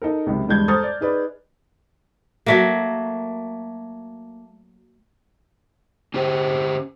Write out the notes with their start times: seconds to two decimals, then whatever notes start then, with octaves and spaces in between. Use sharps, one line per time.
0.02 D#4 A4 A#4
0.26 C#2 F#2 C3
0.49 E2 G2 G#3 D4 G6 G#6
0.68 A4 C5 A#5 D#6 F6 A6
0.83 D5
1.01 D#4 G#4 B4 D5
2.46 F#3 A3 A#3
6.14 C#4 G4 C5